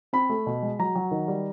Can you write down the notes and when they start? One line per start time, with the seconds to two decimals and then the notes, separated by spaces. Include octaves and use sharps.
0.13 C4 B5
0.30 A3
0.46 B2
0.62 G#3
0.79 F#3 A#5
0.95 F#3
1.11 D#3
1.28 G3